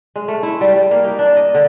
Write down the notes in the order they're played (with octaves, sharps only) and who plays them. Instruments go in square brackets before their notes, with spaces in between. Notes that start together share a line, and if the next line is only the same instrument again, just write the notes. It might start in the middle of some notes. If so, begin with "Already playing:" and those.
[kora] G#3
A3
E4
G3
G3
A#3
D#4
D4
D#5
D3